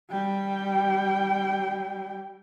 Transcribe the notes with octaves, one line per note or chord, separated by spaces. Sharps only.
G3 G5